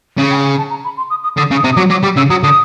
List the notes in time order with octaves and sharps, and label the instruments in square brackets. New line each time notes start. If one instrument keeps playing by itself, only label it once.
[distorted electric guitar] C#3
[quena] G5
G#5
A5
A#5
B5
C6
D#6
D#6
[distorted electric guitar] D3 [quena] D#6
[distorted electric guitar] C#3
[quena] D#6
[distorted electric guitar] C3
[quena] D#6
[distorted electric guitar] F#3 [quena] D6
[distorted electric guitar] F#3 [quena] D6
[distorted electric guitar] G3 [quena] D6
[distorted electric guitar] C#3 [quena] E6
[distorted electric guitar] F#3 [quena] D#6
[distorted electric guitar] D3 [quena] D#6